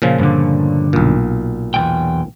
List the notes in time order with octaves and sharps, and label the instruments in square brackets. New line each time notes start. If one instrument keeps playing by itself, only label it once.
[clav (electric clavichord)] A#2 C#3 F3
[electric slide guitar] G2 D3
[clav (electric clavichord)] B1 A#2
[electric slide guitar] E2 F3 G5